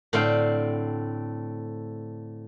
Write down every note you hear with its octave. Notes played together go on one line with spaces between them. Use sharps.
A2 D3 C4 D4 F5 G5